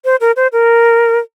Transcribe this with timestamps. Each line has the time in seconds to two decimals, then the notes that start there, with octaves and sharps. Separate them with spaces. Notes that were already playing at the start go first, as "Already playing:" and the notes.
0.05 C5
0.20 A#4
0.36 C5
0.52 A#4